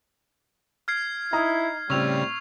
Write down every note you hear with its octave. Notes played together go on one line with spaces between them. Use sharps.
F6 G#6 C7
D#4 E4 A#5 D#6
A2 C#3 G3 C4 C#6 E6 F7